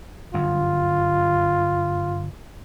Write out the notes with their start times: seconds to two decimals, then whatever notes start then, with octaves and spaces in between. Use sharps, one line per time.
0.34 G1 F#2 F4